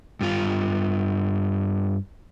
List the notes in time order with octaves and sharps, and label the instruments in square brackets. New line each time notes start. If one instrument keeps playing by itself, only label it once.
[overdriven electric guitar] G2 F4